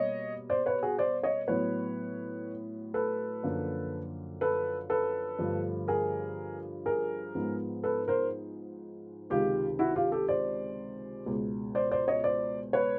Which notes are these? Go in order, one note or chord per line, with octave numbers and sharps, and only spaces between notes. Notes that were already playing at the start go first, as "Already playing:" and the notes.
Already playing: B2 G3 A#3 C#5 D#5
C5 D5
B4 C#5
F#4 G#4
C5 D5
C#5 D#5
A2 F#3 B3 B4 C#5
A4 B4
F#2 D3 F3 A#3
A4 B4
A4 B4
G2 D3 F3 A3
G#4 A#4
G#4 A#4
G#2 F3 G#3 B3
A4 B4
A#4 C5
C#2 C3 D#3 G#3 F4 G4
E4 F#4
F4 G4
G4 A4
C5 D5
C#2 B2 G#3
C5 D5
C5 D5
C#5 D#5
C5 D5
B4 C#5